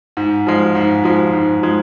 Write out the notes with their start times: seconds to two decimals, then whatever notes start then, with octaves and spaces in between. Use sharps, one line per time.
0.17 G#2
0.47 F3 G#3
0.75 G#2
1.04 F3 G#3
1.33 G#2
1.62 F3 G#3